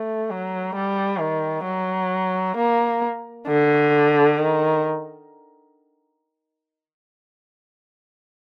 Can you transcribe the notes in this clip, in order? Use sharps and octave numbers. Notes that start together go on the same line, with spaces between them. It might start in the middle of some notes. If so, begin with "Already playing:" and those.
Already playing: A3
F#3
G3
D#3
F#3
A#3
D3
D#3